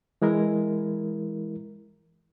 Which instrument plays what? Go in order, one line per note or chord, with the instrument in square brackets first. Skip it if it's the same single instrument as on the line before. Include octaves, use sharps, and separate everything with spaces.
[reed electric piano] E3 G#3 E4 A#4